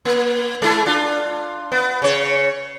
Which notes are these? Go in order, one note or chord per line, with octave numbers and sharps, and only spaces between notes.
A#3
G#3 E4
D4 F4
B3
C#3 C#5